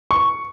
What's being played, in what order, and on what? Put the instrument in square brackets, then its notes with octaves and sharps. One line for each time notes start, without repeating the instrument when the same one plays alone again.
[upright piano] C#6